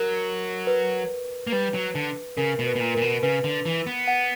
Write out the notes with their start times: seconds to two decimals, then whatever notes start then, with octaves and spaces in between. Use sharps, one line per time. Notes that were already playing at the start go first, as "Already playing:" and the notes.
Already playing: F#3 A#4
0.67 B4
1.47 A#3
1.52 G3 B4
1.74 F#3
1.95 D3
2.37 C#3 A#4
2.59 B2
2.66 B4
2.76 B2
2.80 A#2
2.95 A#2 A#4
3.02 B2
3.23 C#3 B4
3.44 D3
3.66 E3
3.86 B3
4.08 F#5